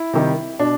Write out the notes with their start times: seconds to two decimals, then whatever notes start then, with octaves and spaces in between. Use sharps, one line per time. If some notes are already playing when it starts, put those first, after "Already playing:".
Already playing: E4
0.13 C3 D#3 G3
0.59 B2 D4